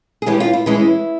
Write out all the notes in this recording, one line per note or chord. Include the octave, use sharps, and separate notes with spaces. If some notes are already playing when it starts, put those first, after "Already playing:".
G#4
E3 G#3 C#4 G4
F4
E4
E3 G#3 C#4 E4